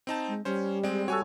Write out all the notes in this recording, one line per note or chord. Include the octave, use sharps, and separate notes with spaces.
C4 D#4 A5
G#3
G3 C#4 C5
G#3 C4 D5
F#4 A4 C#5 G#5 C#6